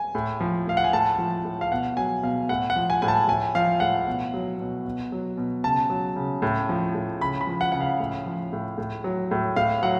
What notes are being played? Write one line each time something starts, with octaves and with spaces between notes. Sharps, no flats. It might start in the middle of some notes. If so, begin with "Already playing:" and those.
Already playing: G#5
A2
F3
A2 F5
F#5
G#5
A2 A5
F3
A2
F5
B2 F#5
F#3 G#5
B2 F5
A2 F#5
F#5
F3
G#5
A2 G#5
A5
A2 G#5
F3 F5
A2 F#5
B2
F#3
B2
B2
F#3
B2
C#3 A5
F#3
C#3
A2
F3
A2
C#3 B5
B5
F3
F#5
C#3 F#5
F5
A2
F3
A2
A2
F#3
A2
A2 F5
F#3 F#5